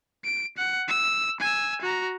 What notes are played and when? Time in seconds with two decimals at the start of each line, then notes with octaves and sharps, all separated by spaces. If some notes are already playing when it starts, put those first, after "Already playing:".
0.24 D7
0.57 F#5
0.88 E6
1.40 G#5 E6
1.81 F#4 A#5